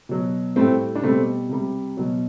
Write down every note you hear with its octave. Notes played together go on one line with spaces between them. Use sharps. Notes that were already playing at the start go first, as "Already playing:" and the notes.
B2 F#3
A2 G3 A3 C4
D4
B2 G3 A3 C4
C3 G3
B2 F#3